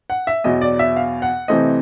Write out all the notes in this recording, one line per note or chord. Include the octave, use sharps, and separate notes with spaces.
F#5
E5
E2 B2 F#3 D#5
D5
E5
F5
F#5
C3 E3 A3 C4 D#5